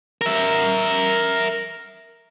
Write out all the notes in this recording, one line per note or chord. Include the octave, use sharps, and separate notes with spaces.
A#4 E5